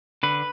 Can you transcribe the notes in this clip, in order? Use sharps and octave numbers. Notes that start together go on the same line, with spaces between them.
D3 B4